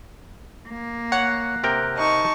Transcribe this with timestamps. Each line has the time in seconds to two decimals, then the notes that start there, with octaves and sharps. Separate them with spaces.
0.69 A#3
1.12 C#5 F#5
1.64 C3 A#4 G5
1.96 D#4 A5 C#6